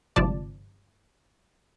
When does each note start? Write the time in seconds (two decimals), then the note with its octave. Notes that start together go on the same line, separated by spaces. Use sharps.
0.16 G1 G#2 C3 F3 D5 A5